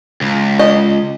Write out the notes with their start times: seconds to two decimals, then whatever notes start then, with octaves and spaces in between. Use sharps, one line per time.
0.21 C#2
0.59 D#5